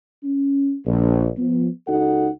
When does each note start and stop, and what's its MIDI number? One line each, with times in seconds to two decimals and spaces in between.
0.23 0.74 61
0.85 1.28 34
1.38 1.68 53
1.38 1.68 59
1.87 2.28 37
1.87 2.28 63
1.87 2.28 66
1.87 2.28 69
1.87 2.28 78